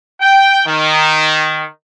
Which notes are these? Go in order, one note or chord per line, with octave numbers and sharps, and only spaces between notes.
G5
D#3